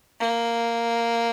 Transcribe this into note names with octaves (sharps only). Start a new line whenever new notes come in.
A#3